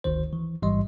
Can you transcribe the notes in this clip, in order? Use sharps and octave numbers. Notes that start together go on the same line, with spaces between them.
G1 D2 D#3 C5
E3
A1 G#2 E3 G3 D#5 C6